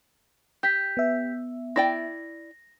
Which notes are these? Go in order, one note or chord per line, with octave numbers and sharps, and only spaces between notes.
G4 G6 B6
B3 E5
E4 D5 G5 A#6